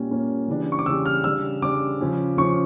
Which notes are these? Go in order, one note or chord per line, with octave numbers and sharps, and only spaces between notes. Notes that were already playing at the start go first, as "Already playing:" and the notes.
Already playing: A#2 G3 A#3 C#4
A#2 G3 A#3 C#4
C#3 E3 G3 D4
C#6
D6
C#3 E3 G3 D4 E6
F6
C#3 G3 D4 E6
C#3 G3 D4 D6
C#3 F3 C#4
C#3 F3 C#4 C#6